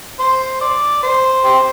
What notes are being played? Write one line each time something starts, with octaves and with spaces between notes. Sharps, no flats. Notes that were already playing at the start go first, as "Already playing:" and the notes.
C5
D5
C5
G4 C5